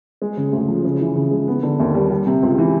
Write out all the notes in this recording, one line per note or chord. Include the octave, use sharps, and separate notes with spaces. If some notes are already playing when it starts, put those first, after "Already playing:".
G#3
C#3
D2
F3
C#3
E3
C#3
G#3
B3
D3
D#2
G3
G3
C3
C#2
E3